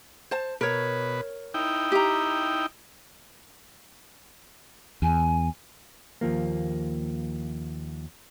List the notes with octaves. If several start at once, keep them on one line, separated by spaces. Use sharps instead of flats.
C5 A5
B2 A#4 B4 C#5
D#4 E4 G5
G4 A#5
E2 G#5
D#2 F3 A#3